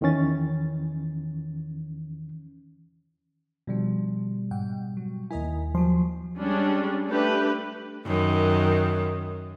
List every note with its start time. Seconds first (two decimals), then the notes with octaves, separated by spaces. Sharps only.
0.01 E2 D#3 E3 C#4 A6
3.67 B2 D3 F3 G3
4.51 G#2 F#5 G5
4.97 F#3
5.31 D#2 E4 A#4 D#5 G#5
5.75 F3 F#3 C6
6.38 G3 G#3 C#4 D4
7.08 A3 D4 G4 B4
8.06 F#2 D#3